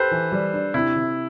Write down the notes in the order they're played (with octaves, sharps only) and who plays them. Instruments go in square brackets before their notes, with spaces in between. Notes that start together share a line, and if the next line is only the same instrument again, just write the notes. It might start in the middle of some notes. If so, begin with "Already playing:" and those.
Already playing: [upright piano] G4 [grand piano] A4 B4 C5
[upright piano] E3
G3
D4
[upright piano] C3 [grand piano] E4
[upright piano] C3